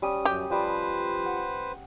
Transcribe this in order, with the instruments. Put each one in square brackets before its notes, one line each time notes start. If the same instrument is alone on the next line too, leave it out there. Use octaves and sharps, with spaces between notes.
[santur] G3 C#4 D#6
[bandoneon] F#2 [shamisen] G4
[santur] F3 G3 F4 [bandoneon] B4 C5
[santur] F#5